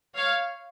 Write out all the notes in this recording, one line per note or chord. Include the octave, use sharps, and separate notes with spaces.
C#5 F5